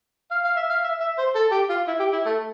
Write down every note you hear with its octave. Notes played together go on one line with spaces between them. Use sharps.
F5
F5
E5
F5
E5
E5
C5
A4
G4
F4
E4
G4
E4
A3